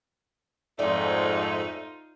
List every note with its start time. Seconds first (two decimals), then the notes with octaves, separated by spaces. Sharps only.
0.79 F2 G#2 A3 D#4 F4 D5 G5 G#5